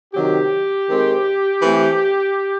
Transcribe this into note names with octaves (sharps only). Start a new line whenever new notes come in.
C3 D#3 F#3 G4
D#3 G#3 C4
E3 A3 C4